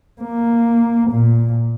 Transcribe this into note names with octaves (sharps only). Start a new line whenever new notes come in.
A#3
A#2